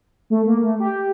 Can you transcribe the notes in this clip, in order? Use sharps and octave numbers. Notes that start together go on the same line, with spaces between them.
A3
A#3
A3
G4